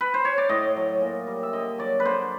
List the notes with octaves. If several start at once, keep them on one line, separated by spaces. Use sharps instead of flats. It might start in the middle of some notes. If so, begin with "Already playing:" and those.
B4
C5
C#5
D5
A2 D#5
F#3
A#2
G3
E5
D3 D#5
F#3 D5
B4
D3 C5